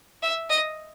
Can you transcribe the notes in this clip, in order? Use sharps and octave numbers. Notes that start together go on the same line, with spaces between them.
E5
D#5